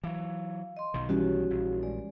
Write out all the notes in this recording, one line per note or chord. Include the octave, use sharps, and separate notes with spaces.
E3 F#3 F5
D#5 C6
B1 B2 D#3
E3 G3 C#4 F#4
A#1
G#3 D5